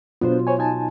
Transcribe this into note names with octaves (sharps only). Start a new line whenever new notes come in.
B2 F#3 B3 D4 F4 C5
C5 C#5 G#5
D#4 G#5 A5